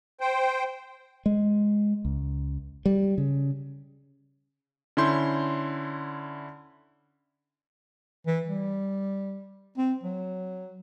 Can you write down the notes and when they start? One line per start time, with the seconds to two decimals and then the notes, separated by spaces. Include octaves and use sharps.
0.20 C5 G5
1.26 G#3
2.05 C#2
2.86 G3
3.18 C#3
4.97 D3 C#4 E4 C6 G6
8.27 E3
8.47 G3
9.78 C4
10.03 F#3